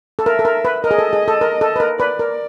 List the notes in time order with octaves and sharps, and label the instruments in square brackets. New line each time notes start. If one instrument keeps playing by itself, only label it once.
[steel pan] A4
[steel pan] A#4 [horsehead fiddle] E5
[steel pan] A4
A#4
B4
[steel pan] A#4 [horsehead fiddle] D#5
[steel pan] G#4
A4
G#4
A4
A#4
A4
B4
A#4
[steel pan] B4 [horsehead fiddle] D5
[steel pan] A#4